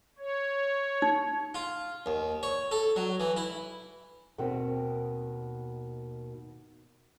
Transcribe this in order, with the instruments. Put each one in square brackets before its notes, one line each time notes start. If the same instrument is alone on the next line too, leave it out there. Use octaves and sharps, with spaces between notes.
[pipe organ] C#5
[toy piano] D#4
[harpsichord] F4
D#2
C#5
A4
F#3
E3
E4
[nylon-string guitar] D#2 B2 D#3 B3 C4